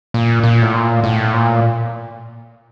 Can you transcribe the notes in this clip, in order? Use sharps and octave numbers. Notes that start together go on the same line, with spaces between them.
A#2
A#2
A2
A#2
A2
A#2